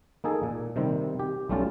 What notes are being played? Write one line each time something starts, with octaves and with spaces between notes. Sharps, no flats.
A#3 D#4 G#4 A4
A#2
C3 D#3 G3 C4
G4
B1 G3 A3 C#4 F4 A5